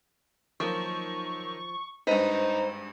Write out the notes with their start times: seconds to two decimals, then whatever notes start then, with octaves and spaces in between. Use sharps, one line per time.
0.60 D#3 F3 F#3 A#3 C#6
2.07 G#1 G2 D#4 B4 C5 D#5